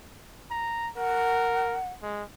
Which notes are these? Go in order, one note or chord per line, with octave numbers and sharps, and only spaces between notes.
A#5
A#4 F#5
G#3